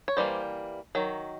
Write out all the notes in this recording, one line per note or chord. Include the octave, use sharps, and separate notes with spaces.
C#5
E3 G3 A#3 C5 D5
D#3 F#3